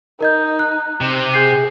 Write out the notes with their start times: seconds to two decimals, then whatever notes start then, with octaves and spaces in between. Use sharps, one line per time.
0.21 D#4 A#4 D#5 G6
0.59 F#6
1.01 C3
1.34 G#4 G6 C7